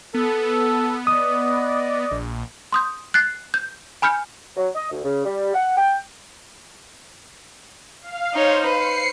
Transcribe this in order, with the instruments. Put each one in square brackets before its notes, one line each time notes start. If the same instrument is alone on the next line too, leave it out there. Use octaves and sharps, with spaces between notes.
[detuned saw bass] B3 [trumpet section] A4
[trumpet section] D5 D#5 [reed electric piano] D#6
[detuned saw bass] A#1
[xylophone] C6 D#6 G6
F#6 A6 C7
G6
G#5 B5 F6 G6 C#7
[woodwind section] F#3
D#5
D2
C#3
G3
F#5
G5
[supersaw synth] F5
[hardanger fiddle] D#4 C#5 [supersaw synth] C5
[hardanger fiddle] B4 [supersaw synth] C7 C#7